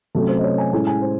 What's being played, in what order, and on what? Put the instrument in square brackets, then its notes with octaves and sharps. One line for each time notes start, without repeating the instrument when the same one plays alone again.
[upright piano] C3 F#3 A3 C#4 A4
C5
D#5
C#5
G#5
A2 G#3 C#4 G#5
G#5
C5